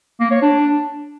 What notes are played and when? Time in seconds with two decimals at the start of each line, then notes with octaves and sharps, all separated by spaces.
0.20 A#3
0.31 C#5
0.42 D4